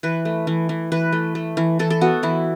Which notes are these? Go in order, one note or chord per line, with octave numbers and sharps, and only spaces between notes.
E3 B4
A3
E3
E3
E3 B4
A3
A3
E3
E3 A4
A4
B3 F#4
E3 E4